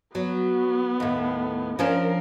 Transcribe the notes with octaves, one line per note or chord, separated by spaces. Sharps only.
F#3 B3
D#2 A2
F3 C#4 D4 A#4